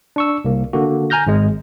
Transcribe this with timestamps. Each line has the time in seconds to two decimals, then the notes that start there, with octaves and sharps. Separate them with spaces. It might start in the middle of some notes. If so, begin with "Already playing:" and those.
0.16 D4 C#6 E6
0.45 C2 A#3
0.73 D3 A#3 F#4
1.10 G#5 A#5 F6 G6 A#6
1.27 G#1 G#3